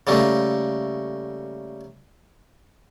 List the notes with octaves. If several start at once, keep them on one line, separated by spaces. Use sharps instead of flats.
C#3 G3 A3 A#3